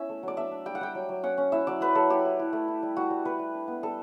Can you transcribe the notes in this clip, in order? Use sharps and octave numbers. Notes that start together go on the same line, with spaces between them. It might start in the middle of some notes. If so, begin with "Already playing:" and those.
Already playing: B3 C#4 E4 E5
A3
F#3 D5
D4 E5
D4
G3 G5
F#5
G3 G5
F#3
F#3
C#4 F#5
C#4
E4 E5
F#3 D5
F#3 B4
F#3 A4
E4 G4
E4
E4
A3
E4
G3
G3 F#4
G3
G3 B4
G3
D4
B3
G3 A4